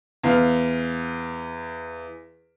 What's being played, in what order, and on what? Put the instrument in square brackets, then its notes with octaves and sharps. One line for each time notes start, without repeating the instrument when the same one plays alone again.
[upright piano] E2 F5